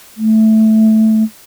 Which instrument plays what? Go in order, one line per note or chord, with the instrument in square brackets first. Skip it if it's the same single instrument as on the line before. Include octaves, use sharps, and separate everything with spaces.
[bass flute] A3